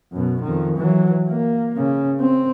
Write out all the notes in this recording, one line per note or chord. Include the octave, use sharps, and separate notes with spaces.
F#2 B2
F2 D#3
E3 F#3
A#3
C#3
C4